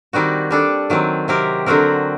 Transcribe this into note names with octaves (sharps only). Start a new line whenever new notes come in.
D#3 G3 C4 D#4 F#4
G3 D4 A4
D#3 F#3 C4
C3 F#3 C4 G4 A#4
D3 F#3 C4 F#4 A#4